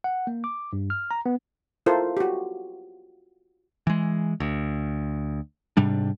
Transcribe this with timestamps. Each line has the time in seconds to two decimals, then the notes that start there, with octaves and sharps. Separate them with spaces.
0.04 F#5
0.27 A#3
0.44 D6
0.73 G2
0.90 F6
1.11 A#5
1.26 B3
1.86 E4 F4 A4 A#4 C5
2.17 F#4 G4
3.87 E3 G#3
4.40 D2
5.77 G#2 C3 G3 D4